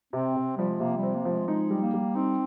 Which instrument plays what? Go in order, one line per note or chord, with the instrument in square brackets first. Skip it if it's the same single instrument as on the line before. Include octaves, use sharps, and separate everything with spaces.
[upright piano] C3 [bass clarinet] C4
[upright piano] C3
[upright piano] F3 [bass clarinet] G3
[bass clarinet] G#3
[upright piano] C3 [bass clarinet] A#3
[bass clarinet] G3
[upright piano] C4
[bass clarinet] A#3
[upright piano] F3
[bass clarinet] G#3
[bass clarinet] G#3 [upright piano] D#4
[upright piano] G3
[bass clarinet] A#3
[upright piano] G3
[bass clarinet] C4 [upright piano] D#4